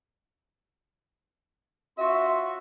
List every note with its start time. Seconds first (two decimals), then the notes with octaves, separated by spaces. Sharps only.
1.98 C#4 F4 F#4 E5 C6